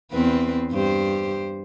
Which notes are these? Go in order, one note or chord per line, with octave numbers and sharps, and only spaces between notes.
E2 C4 B4
G2 G4 C5